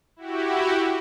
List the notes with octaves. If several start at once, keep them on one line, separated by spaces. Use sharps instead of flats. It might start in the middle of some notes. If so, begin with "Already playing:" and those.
E4 F#4 G4